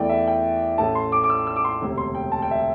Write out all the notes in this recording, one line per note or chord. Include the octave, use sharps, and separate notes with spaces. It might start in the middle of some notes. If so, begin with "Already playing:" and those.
Already playing: E2 E3 A3 D5 G5
E5
G5
A1 A2 A3 A5
C6
D6
D6
E6
E6
D6
C6
E1 D2 C3
C6
G5
A5
G5
E5